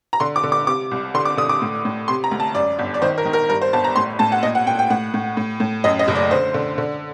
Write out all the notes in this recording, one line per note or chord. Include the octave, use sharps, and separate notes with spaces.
A#5
D3 C6
D6
D3
D6
C3 D6
C2
D3 C6
D6
D3 D#6
D6
A2
A2
C3 C6
A#5
D2
A5
F#2 D5
G1
D5
D#3 C5
A#4
D#3
A#4
G2 A#4
C5
G1 A5
A#5
A2 C6
A2 A5
F#5
A#2 D#5
F#5
A#2 G5
G5
A2 F#5
A2
A2
A2
F#2 D#5
D#5
F#1
D5
D3 C5
D3
D3